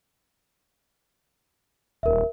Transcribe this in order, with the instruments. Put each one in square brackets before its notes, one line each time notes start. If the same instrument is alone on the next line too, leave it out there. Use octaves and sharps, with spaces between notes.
[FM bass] D#1 [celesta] A#4 E5